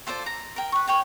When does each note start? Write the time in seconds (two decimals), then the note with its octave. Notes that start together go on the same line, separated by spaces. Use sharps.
0.07 F4 A4 C5 D5
0.26 A#5
0.56 A#4 G5
0.72 B4 C#6
0.87 C#5 G5 G#5